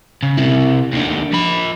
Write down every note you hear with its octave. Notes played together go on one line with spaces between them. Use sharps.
C#3
C3 E4
D#2 D3
F3 B5